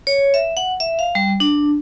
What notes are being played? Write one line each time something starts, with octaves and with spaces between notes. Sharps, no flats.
C#5
E5
F#5
E5
F5
G3
D4